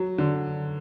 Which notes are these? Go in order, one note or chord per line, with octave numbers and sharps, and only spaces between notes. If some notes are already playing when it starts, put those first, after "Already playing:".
Already playing: F#3
D3